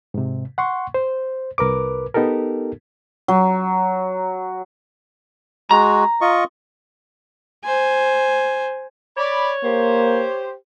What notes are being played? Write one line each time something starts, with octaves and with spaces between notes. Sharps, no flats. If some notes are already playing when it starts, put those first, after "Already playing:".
G#2 C3
F#5 C6 C#6
C5
C2 A#4 B4 D6
B3 D#4 G4 A4 A#4
F#3
G#3 F#4 A#5
F4 D#5 C#6
C5 G#5
C#5 D5 B5
A#3 G4 C5